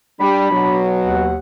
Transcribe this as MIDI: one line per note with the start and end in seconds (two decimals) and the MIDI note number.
0.20 0.49 55
0.20 0.79 62
0.20 0.79 83
0.51 1.31 47
0.51 1.31 54
1.06 1.37 39
1.06 1.37 78